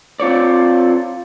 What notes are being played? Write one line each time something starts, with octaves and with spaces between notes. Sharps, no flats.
C4 F4 C#5 D5